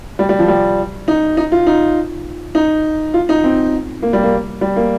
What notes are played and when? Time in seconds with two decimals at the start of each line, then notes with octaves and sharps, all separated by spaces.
0.19 G3
0.29 G3
0.39 F3
0.48 G3
1.08 D#4
1.37 D#4
1.52 F4
1.67 D#4
2.55 D#4
3.14 F4
3.29 D#4
3.44 C4
4.02 A#3
4.13 G3
4.23 A#3
4.61 G3
4.76 A#3